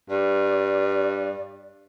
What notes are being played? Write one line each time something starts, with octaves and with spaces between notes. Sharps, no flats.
G2 D5